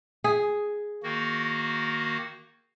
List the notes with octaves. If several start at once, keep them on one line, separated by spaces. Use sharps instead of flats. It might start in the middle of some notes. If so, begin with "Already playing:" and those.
G#4
D#3 A#3 F#4